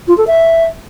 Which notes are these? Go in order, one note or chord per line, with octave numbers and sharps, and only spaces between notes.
F4
A4
E5